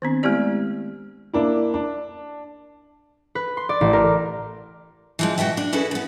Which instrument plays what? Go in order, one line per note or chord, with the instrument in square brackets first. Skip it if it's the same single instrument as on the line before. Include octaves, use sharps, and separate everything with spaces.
[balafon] D#3 B3 C4 D4
G#3 A3 B3 E4 G4 D5
[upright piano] A#3 D4 E4
D4
[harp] B4
C6
D5
A1
A#4
[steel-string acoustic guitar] E3 F3 G#3
B2 F#4 E5 G5
D4
C#4 E4 F#4 G#4 A4 B4
E3 B3